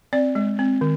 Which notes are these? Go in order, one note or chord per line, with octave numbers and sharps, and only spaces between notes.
C4 D5
G#3
C4
D#3